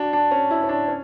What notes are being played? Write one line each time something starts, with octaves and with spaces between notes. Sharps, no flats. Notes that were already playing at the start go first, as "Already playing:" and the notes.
Already playing: D4 F#4
D4
C#4
E4
C#4
D4
C#4